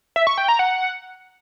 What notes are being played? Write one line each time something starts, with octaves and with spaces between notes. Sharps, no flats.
E5
C#6
G5
A#5
F#5